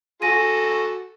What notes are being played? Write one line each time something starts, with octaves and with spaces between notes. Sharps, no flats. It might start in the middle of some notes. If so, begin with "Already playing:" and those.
F#4 A4 G#5 A#6 D#7